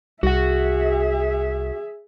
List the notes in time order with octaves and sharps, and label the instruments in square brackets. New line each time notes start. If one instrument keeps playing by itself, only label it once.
[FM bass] C2 [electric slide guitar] F#4 F#5 [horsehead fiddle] G#4 E5